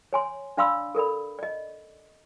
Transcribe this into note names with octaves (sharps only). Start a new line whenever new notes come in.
C#5 G#5 C6
D4 D5 F5 B5 C6 E6
A4 A#4 D5 B5
D5 D#5